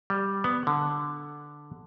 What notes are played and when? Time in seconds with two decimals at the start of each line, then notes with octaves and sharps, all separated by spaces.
0.10 G3
0.44 B3
0.67 D3